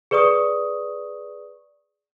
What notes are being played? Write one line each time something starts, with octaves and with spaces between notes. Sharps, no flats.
G#4 B4 D5 C#6 D#6